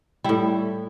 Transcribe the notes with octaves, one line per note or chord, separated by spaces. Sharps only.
A2 G3 E4